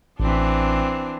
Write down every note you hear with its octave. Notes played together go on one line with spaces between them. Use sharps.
A1 E3 C4 D4